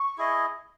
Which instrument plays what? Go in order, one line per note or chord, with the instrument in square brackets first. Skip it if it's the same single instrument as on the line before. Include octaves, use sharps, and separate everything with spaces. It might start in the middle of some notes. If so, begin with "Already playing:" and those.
Already playing: [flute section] C#6
[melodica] E4 G#4 D#5